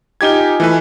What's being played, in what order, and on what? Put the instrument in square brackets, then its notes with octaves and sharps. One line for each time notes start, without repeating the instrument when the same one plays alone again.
[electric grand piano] D#4 G4 G#6 [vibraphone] F4 D#5 G#5
[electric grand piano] E3 A3 B4